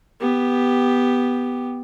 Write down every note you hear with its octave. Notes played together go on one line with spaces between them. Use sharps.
B3 G4